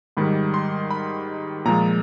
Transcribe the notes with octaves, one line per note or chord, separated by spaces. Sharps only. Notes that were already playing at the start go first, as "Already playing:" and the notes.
G#2 D#3 G3 B5
C6
B5
A#2 F3 G#3 A#5